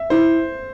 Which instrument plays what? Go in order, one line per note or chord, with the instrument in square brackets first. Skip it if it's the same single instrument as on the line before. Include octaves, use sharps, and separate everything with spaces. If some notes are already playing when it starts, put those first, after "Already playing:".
Already playing: [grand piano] E5
[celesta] E4 [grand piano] C5